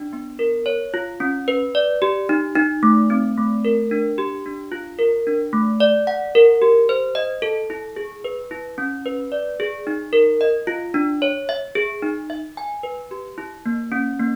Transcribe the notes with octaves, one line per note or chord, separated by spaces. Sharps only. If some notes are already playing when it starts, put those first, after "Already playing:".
Already playing: D4
B3
A#4
C#5
F4
C#4
B4
D5
G4
D#4
D#4
A3
C4
A3
A#4
D4
G4
D4
F4
A#4
D4
A3
D5
F#5
A#4
G4
C5
D#5
A4
E4
G#4
B4
E4
C#4
B4
D5
G#4
D#4
A#4
D#5
F4
D4
C#5
E5
G#4
D#4
E5
G#5
B4
G4
E4
A#3
C#4
A#3